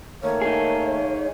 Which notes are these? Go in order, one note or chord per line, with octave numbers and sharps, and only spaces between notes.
D#3 A3 A#3 C#5
D#4 G#4